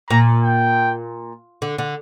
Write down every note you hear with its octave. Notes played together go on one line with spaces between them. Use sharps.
A#2 A#5
G5
D3
D3